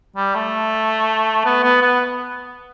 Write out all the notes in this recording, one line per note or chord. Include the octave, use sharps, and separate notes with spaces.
G3
A3
B3
B3
B3